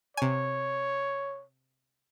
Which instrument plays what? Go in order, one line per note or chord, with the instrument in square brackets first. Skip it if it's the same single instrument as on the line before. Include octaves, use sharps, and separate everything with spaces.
[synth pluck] C3 G#5 [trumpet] C#5